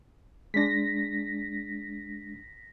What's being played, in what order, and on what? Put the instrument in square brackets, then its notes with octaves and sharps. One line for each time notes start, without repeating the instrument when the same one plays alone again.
[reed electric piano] G#3 D4 [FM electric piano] A#6 B6